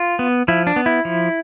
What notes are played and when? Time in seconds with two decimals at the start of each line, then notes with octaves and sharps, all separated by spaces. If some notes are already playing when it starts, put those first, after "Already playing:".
Already playing: F4
0.19 B3
0.48 F3 E4
0.67 D4
0.76 B3
0.86 E4
1.05 F3